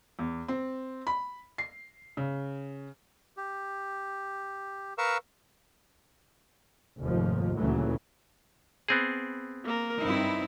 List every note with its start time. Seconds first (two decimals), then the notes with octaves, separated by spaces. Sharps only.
0.19 E2
0.48 C4
1.07 B5
1.58 C7
2.17 C#3
3.37 G4
4.98 A#4 B4 F5 A#5 C#6 E6
7.00 F1 D#2 G#2 F3
7.55 D2 A#2 C#3 E3 F#3 A3
8.89 B3 C4 G#4
9.64 A#3 A#4
10.02 G2 C4 D#4 E4